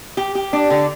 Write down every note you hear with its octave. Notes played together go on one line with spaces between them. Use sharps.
G4
G4
D4
D3